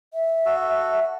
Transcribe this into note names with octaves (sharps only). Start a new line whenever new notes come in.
E5
F#4 A4